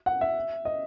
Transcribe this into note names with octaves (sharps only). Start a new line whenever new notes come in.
F#5
E5
D#5